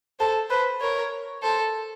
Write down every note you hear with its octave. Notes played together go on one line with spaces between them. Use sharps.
A4 C5
B4 C5
A#4 C#5
A4 C5